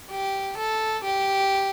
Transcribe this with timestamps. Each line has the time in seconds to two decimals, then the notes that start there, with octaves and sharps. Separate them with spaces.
0.11 G4
0.57 A4
1.04 G4